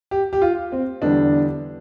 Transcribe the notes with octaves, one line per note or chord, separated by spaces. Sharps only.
G4
G4
F4
C4
E2 D3 G3 D4